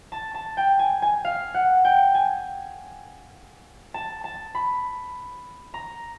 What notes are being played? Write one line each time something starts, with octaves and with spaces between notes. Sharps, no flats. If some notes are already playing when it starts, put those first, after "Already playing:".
A5
A5
G5
G#5
G#5
F5
F#5
G5
G#5
A5
A5
B5
A#5